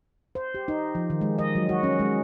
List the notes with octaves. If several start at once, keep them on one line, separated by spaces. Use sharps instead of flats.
C5
G4
D#4
F3
D#3
G#3
D#5
F#3
F#4
C#4
G#3